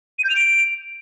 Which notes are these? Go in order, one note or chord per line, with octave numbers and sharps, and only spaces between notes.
D#7
G6
F7
D7